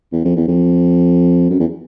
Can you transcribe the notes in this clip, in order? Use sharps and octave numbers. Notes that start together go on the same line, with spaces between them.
E2
F2
E2
F2
F#2
E2